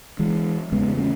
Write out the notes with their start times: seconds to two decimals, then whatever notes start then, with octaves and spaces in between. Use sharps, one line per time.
0.19 E3 G#3
0.72 E2 C#3 G#3 B3
0.98 A3 C#4